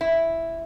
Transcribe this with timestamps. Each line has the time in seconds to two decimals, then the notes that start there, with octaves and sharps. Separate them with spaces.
0.01 E4